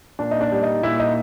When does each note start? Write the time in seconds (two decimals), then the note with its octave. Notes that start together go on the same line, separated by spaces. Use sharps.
0.19 A#2 D4
0.31 D#4
0.41 D4
0.52 G3
0.63 D#4
0.83 A#2 E4
0.99 D#4